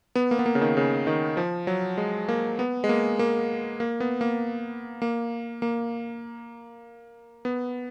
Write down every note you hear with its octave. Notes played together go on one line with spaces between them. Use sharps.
B3
A#3
B3
A#3
C#3
D#3
C#3
D#3
F3
F#3
G#3
A#3
B3
G#3
A#3
A#3
A#3
B3
A#3
A#3
A#3
B3